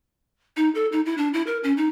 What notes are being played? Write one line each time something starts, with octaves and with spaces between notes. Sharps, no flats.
D#4
A4
D#4
E4
D4
E4
A#4
C#4
D#4